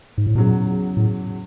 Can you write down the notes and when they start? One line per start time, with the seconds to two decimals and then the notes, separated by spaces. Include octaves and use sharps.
0.18 G#2
0.27 A2
0.35 E2 A#2 C#3 F#3
0.97 A2